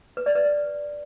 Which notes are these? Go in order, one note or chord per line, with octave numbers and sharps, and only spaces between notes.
B4
D5
B4